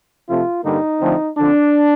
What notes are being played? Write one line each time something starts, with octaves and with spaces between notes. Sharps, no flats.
C3 F3 A3 C4 F4
G2 D3 G3 A#3 D#4
D3 F3 A3 C4
D3 F3 C4 D4